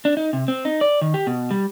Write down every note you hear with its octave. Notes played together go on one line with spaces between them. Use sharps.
D4
D#4
C3
C4
D#4
D5
D#3
G4
B2
G3